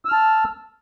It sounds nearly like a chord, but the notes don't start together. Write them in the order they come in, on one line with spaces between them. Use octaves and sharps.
E6 F6 A5